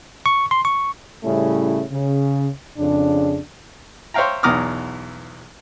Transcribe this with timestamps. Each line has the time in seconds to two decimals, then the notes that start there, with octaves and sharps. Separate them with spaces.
0.26 C#6
0.51 C6
0.65 C#6
1.24 A2 C#3 G3 A3 C#4 E4
1.91 C#3
2.77 F2 C#3 D4
4.14 C5 C#5 E5 F5 G5 A#5
4.43 B1 E2 A#5 D6 D#6 F6